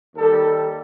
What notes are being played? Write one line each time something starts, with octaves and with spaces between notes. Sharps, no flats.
D#2 D#3 G3 A4